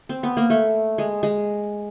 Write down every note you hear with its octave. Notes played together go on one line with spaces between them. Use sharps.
C4
B3
A#3
A3
G#3
G#3